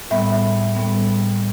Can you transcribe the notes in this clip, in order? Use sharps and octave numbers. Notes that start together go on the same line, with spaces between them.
A2 G3 B3 E5
A2 G3 B3